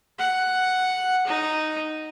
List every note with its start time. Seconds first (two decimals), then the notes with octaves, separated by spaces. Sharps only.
0.19 F#5
1.27 D#4